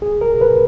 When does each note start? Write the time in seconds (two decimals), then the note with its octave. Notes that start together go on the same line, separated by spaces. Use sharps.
0.02 G#4
0.21 A#4
0.41 B4